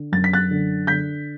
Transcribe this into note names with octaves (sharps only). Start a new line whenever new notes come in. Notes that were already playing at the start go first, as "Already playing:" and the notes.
Already playing: D3
F#2 A6
B6
F#6 A6
D3
D3 G6 B6